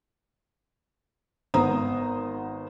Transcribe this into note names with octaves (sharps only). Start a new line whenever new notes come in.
G#1 B3 C5 A#5 D#6